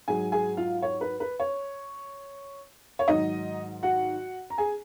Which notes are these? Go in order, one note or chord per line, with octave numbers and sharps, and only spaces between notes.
G#2 F#3 G#4 G#5
G#4 G#5
F4 F5
C#5
B4
B4
C#5
C#5
G#2 D#3 F#3 D#4 D#5
F#4 F#5
A#5
G#4 G#5